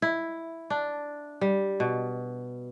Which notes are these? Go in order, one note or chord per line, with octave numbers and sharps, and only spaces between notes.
E4
D4
G3
B2